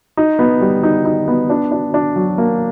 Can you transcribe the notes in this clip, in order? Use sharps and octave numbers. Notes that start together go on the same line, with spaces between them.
D#4
B3
G3
D#4
D#4
B3
D4
D4
D4
F#3
A#3